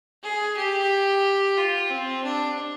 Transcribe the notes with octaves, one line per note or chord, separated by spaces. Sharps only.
G#4
G4
F4
C4
D4